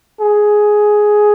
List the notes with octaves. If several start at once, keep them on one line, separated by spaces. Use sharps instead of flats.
G#4